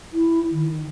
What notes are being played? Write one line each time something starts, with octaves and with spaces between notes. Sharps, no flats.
E4
D#3